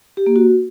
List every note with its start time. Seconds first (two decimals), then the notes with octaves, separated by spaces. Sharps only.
0.17 G4
0.26 A#3
0.36 F#4